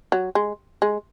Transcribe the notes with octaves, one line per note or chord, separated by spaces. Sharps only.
F#3
G#3
G#3